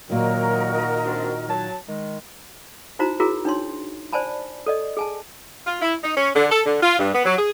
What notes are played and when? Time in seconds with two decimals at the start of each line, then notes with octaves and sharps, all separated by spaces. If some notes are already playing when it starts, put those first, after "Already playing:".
0.10 A#2 D#3 F#3 F#4 A#4 D#5
1.05 C4 D4 F4
1.49 F#3 A5
1.88 D#3 G#3
2.99 D#4 E4 F#4 C5 A#5
3.20 E4 F#4 G#4 A#4 A#5
3.45 D4 D#4 C#5 C6
4.13 C5 D5 G#5 A5 B5
4.66 A4 D5 D#5
4.97 G#4 G#5 A5
5.66 F4
5.82 E4
6.03 D#4
6.15 C#4
6.34 D3
6.49 A4
6.65 D3
6.82 F4
6.99 G2
7.13 B3
7.25 F#3
7.37 G#4